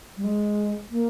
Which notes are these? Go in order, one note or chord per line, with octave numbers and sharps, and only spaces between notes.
G3
G#3
A#3